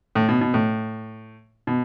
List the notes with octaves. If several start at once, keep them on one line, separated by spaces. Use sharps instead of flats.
A2
B2
B2
A2
B2